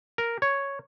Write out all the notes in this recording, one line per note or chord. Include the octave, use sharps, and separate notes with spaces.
A#4
C#5